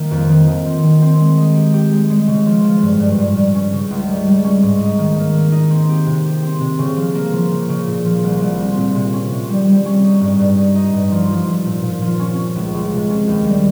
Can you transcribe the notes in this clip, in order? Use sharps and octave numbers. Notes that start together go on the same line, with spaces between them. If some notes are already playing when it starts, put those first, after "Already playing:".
Already playing: D#3 A#3
F2
D#3
D#3
C4
D#3
C4
G#3
D#4
G4
G4
G#3
G#3
C#3
F3
F3
G2
G2
G2
G2
C#4
C#3
C#2
G3
G3
C#4
G#2
D#4
D#3
A#3
A#3
D#4
C4
G4
C3
G4
C4
C3
C#3
F3
A#3
F3
C#3
C#3
A#2
F3
C2
C2
C4
A#2
C3
C#4
C3
G3
G3
C#4
D#4
G2
G2
D#4
D#4
G2
F3
F3
F3
A#2
A#2
F3
C#4
C#4
C#2
C#2
C3
C#4
D#2
G3